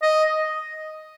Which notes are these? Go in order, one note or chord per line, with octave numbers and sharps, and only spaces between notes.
D#5